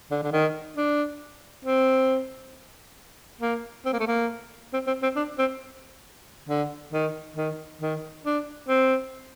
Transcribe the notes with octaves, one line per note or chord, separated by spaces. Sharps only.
D3
D3
D#3
D4
C4
A#3
C4
A#3
A3
A#3
C4
C4
C4
D4
C4
D3
D#3
D#3
D#3
D4
C4